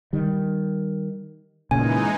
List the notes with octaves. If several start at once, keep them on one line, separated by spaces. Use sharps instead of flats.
D#3 G3
A#2 C#3 E3 G#3 D#4 G#5